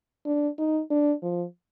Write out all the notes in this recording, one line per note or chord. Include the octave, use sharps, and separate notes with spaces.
D4
D#4
D4
F3